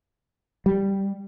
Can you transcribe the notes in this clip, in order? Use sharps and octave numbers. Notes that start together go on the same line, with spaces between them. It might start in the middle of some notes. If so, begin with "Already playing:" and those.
G3